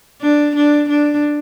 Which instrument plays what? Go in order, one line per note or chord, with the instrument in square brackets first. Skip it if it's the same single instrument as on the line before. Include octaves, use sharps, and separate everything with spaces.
[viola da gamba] D4
D4
D4